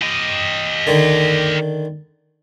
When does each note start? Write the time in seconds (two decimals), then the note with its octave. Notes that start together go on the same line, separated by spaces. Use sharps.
0.02 G4 D#5
0.87 D3 D#3